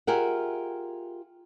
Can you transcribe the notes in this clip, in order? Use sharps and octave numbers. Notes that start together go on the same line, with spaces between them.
F4 G4 G#4 A#4 E5 F#5